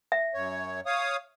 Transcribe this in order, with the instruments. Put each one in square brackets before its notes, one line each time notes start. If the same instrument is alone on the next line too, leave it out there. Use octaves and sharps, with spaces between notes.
[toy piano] E5
[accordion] F#2 C#5
C#5 F5 D#6